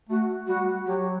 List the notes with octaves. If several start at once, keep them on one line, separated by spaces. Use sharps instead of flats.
A3 F#4
G3 F#4
F#3 G4